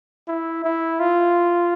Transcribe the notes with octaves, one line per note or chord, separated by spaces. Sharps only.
E4
E4
F4